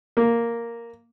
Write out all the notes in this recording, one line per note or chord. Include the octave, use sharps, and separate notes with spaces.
A#3